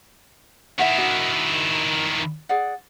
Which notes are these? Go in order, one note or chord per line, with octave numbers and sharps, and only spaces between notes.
D#3 E4 E5 F#5
D4 F#4
G#4 D5 F#5